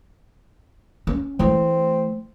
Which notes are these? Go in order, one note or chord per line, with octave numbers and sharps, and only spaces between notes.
C#4
E3 A3 C4